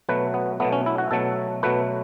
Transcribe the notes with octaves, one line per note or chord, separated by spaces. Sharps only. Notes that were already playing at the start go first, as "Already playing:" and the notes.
B2 F#3 A3 B4
B3
B2 F#3 A3 B3
C#4
E4
F#4
B2 F#3 A3 A4
B2 F#3 A3 B4